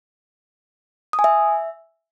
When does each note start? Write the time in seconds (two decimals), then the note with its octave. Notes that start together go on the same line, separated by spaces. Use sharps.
1.13 D#6
1.19 G#5
1.24 E5